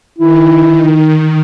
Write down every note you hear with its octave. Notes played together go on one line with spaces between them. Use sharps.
D#3 E4